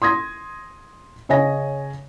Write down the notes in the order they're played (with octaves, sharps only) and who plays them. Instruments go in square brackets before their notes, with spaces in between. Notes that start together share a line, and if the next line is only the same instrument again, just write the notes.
[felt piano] C6 D#6 G#6 A#6
C#3 C#5 D#5 G#5 A#6